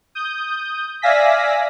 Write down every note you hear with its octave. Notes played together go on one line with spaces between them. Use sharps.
D#6 G6
D5 E5 F5 G#5 A#6 B6